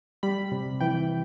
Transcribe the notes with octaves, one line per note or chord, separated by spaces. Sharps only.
G3 B5
C3
E3 G5